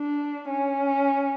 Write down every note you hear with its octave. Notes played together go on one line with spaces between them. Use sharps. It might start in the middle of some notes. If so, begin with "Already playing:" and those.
Already playing: D4
C#4